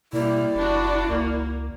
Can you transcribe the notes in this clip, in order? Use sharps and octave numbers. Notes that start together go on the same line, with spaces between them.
B2 G3 A#3 E4 D5
F#1 D4 F#4
C#2 A#3